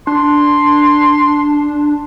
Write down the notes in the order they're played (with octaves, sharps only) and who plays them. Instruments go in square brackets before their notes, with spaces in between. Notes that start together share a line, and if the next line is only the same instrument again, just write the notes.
[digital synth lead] D4 [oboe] C6